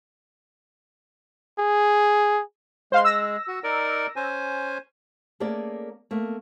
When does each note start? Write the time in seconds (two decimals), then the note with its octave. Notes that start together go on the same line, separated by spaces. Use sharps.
1.59 G#4
2.92 G#3 C5 F5 C6
3.05 E6 A#6
3.48 F#4
3.64 D#4 A#4 D5
4.16 C#4 C5 G#5
5.40 A3 A#3 C#4 G#4 A#4 D5
6.11 A3 A#3